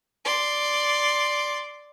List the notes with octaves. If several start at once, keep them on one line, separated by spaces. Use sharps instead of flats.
D5 C6